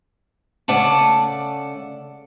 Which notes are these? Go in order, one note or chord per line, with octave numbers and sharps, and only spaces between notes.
C#3 A3 D5 F#5 A5